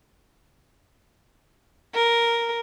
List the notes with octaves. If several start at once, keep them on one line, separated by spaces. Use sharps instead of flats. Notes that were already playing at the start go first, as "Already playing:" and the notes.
A#4